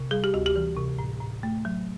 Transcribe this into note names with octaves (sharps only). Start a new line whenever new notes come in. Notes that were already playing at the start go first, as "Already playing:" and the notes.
Already playing: C3
G3 G#4
G4
D2 F#4
G4
E3
C3
A2
A2
A3
F#3